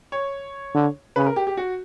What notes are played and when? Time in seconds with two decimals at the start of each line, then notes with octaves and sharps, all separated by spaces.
0.12 C#5
0.74 D3
1.16 C#3 B4
1.26 A#4
1.36 G4
1.47 G4
1.57 F#4